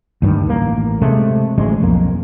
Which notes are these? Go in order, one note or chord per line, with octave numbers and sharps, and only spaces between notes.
D2 G2 D#3
A1 A#3
C3 G#3 A3
A1 D2 G#3
B1 F2 A#3